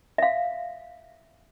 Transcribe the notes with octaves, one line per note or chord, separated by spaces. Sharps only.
E5 F5